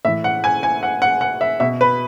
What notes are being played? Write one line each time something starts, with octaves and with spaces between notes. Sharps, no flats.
A2 E3 E5
F#5
G#5
G#5
F#5
F#5
F#5
E5
B2 E5
B4